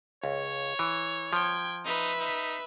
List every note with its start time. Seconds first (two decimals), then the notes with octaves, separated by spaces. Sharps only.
0.24 C#2 C#5
0.79 E3
1.33 F3 G5 G#6
1.86 D#4 B4 E5
2.19 D#4